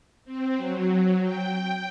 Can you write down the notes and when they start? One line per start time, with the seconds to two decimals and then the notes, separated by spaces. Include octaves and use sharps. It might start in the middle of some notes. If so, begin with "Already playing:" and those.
0.25 C4
0.57 F#3
1.23 G5